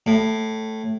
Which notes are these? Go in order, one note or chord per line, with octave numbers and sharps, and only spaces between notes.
A2